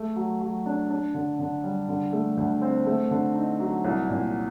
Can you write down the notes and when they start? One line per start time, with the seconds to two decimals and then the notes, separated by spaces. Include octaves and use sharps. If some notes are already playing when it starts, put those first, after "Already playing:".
Already playing: A3
0.16 F#3
0.41 F#3
0.66 D4
0.90 D4
1.14 D3
1.39 D3
1.64 G3
1.89 D3
2.13 A3
2.37 D2
2.62 C4
2.86 A3
3.11 D3
3.35 D#4
3.60 F#3
3.85 C2
4.09 A#2